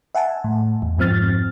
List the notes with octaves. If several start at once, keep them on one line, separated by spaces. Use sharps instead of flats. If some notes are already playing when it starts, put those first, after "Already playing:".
E5 F#5 G#5 A5
A2
E2
F2 G#2 F3 C4 F6 A6